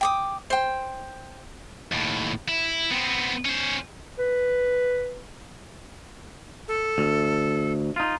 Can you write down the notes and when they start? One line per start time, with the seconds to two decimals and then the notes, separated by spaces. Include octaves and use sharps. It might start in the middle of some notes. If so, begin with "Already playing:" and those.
0.01 G5 D6 D#6
0.50 C5 G5
1.92 D#2 A2
2.48 E4
2.91 B3 C4
3.45 C#4 C5
4.19 B4
6.68 A4
6.98 D2
7.96 D#4 F4